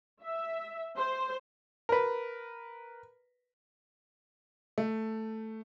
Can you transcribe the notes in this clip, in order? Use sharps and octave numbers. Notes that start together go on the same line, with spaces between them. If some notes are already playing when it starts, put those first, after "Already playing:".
E5
C5
A#4 B4
A3